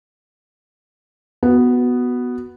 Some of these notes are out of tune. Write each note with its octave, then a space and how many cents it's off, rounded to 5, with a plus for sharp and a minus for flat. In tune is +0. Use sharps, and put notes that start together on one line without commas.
B3 +0 F#4 +0